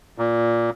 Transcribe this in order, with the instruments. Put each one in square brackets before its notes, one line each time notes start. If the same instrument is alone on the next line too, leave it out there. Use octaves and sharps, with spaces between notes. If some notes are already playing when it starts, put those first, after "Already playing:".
[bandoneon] A#2